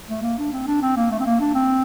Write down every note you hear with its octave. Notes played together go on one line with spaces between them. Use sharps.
A3
A#3
D4
C4
D4
C4
A#3
A3
C4
A#3
D4
C4